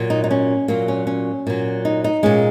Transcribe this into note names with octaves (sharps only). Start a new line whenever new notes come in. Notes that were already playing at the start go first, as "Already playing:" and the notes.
Already playing: A#2 F#3
D#4
D#4
C#4
A#2 F#3 A#3
C#4
C#4
A#2 F#3
D#4
D#4
A#2 G#3 C#4